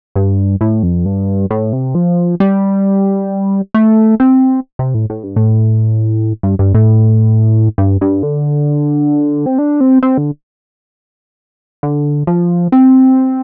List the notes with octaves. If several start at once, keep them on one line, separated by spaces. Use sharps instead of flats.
G2
A2
F2
G2
A2
C3
F3
G3
A3
C4
C3
A2
A2
G2
A2
G2
G2
A2
G2
G2
D3
C4
D4
C4
C4
D3
D3
F3
C4